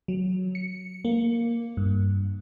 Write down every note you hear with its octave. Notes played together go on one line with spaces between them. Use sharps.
F#3
C#7
A#3
G2